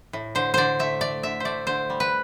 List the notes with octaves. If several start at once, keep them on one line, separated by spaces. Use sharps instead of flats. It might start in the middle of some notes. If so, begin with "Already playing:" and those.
A2
D3 C5
D3 C5 D5
A3 E5
A3 D5
D3 E5
A3 C5 D5
D3 C5
G3
B4